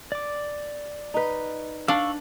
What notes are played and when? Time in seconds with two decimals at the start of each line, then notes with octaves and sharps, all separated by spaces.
0.12 D5 D6
1.14 D#4 B4
1.88 D4 F5 C#6 E6 F#7